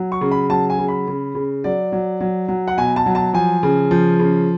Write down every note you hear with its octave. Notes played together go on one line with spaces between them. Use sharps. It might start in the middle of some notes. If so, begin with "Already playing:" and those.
Already playing: F#3
C#6
C#3
B5
F#3 A5
G#5
C#3
B5
C#3
C#3
F#3 D5
F#3
F#3
F#3
F#5
B2 G#5
A5
F#3
A5
F3 G#5
C#3
F3
C#3